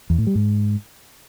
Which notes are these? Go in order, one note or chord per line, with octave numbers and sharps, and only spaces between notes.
E2
A2
G3
G#2